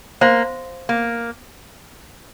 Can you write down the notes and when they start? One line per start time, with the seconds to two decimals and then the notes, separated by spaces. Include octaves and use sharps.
0.21 A#3 C5 F5 C6
0.89 A#3